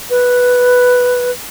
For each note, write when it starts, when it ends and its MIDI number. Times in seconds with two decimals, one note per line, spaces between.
0.10 1.31 71